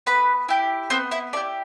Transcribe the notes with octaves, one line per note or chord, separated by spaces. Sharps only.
B3 B4 B5
E4 G4
B3 C4 C5
E4 E5
D4 E4 G4 D5